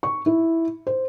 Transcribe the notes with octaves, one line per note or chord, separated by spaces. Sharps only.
C#6
E4
C5